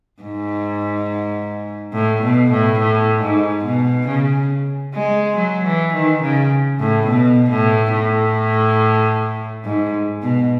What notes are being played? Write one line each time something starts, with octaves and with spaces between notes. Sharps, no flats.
G#2
A2
B2
A2
A2
G#2
B2
C#3
G#3
F#3
E3
D#3
C#3
A2
B2
A2
A2
G#2
B2